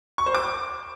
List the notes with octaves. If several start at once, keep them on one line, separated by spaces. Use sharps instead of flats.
C#6
C5
D6